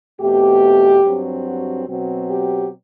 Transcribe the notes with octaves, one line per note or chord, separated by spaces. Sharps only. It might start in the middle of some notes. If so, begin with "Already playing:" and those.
E2 B2 A3 C4 G4
G2 F#3 C4
F#4
B2 F#3 C4
G4